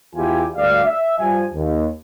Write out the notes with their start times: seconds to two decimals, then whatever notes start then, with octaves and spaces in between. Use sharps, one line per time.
0.15 E2 E4 F4 G4 G#5
0.56 D2 G3 D5 F5
0.85 E5
1.19 G2 F3 G#5
1.54 D#2